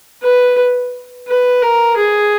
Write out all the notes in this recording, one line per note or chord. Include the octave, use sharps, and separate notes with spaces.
B4
B4
A#4
G#4